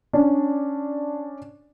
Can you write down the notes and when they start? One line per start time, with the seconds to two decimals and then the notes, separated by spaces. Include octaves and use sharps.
0.13 C#4 D4